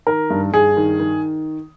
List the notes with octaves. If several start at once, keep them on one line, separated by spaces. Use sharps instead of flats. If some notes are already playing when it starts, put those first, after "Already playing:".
D#3 A#4
G2
G2 G#4
D#3
D#3